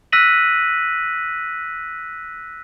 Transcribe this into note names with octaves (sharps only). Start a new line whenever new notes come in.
E6 F#6 A#6 B6 D#7 F#7